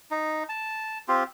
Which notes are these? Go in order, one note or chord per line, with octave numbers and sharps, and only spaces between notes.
D#4
A5
C4 F4 G4